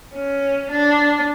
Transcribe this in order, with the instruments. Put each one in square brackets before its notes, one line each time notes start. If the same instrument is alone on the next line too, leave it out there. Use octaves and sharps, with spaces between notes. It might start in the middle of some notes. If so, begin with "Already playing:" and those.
[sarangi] C#4
D4